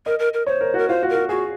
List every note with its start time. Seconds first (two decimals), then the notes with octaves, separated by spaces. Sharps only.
0.06 A#4 D#5
0.19 A#4
0.33 A#4
0.46 C5 C#5
0.61 A#4
0.74 F#4 A#4
0.89 F4 C5
1.03 F#4
1.10 A#4
1.15 F#4
1.29 F#4 G#4